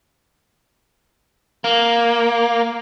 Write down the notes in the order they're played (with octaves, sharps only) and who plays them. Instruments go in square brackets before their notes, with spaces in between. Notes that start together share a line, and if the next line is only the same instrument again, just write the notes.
[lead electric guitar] A#3